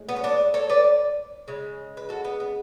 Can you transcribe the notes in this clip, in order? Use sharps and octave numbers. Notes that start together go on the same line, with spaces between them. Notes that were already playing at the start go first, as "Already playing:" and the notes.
Already playing: A2 G#3
B3
C#4
B3 D4
A4 C#5
B4 D5
C#3 G#3
B4
F#4 A4
B3
B3